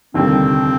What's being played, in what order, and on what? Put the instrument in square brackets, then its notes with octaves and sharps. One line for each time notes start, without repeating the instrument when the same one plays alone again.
[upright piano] F1 D#2 D3 G3 [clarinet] C4